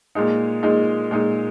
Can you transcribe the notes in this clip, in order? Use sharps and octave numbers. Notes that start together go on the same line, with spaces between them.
A#2 G#3 D#4
A#2 G#3 D#4
A#2 G#3 D#4